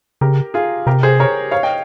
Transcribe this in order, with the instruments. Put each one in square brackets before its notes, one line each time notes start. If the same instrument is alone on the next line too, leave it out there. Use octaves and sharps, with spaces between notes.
[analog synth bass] C#3 [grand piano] G4 A#4
[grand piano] F4 G#4
[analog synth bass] C3 [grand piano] G4 A#4
[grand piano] G#4 C5
A#4 C#5
C#5 F5
D#5 G5